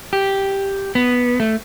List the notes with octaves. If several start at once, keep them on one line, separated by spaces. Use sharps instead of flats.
G4
B3
A3